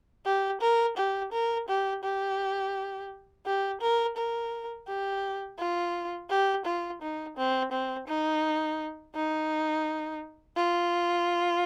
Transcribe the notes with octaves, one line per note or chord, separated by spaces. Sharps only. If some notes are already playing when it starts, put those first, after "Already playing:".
G4
A#4
G4
A#4
G4
G4
G4
A#4
A#4
G4
F4
G4
F4
D#4
C4
C4
D#4
D#4
F4